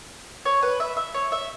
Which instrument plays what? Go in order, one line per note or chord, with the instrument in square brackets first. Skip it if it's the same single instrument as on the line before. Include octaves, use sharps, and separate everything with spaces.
[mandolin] C#5
B4
E5
E5
C#5
E5